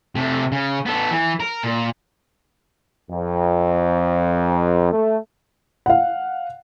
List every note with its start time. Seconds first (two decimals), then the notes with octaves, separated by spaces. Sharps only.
0.15 C3 A3
0.52 C#3
0.86 B3 A4
1.11 E3
1.40 A#4
1.63 A#2
3.11 F2
4.92 A3
5.86 F5 F#5